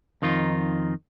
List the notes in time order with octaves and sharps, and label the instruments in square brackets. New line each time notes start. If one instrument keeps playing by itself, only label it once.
[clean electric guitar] F2 D#3 D#4 F4